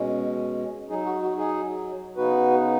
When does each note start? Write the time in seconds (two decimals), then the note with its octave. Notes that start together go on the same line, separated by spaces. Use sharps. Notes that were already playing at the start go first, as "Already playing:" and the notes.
Already playing: B2 G#3 C#4
0.89 F#3 D#4 G#4
1.05 F#4
1.22 F#4
1.37 D#4 G#4
2.17 C#3 B3 D#4 F#4 B4